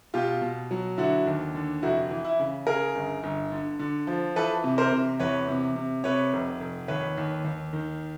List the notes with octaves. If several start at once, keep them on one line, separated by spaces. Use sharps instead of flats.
B2 F4 G4
B2
F#3
D3 E4 F#4
D#2
D3
F1 E4 F#4
E3
E4
C#3
C#3 G#4 A#4
G1
G1
D3
D3
F3
E3 A4 B4
C3
A#4 C5
C3
E2 B4 C#5
C3
C3
C3 B4 C#5
F1
F1
D#2 B4 C#5
D#2
D#2
D#3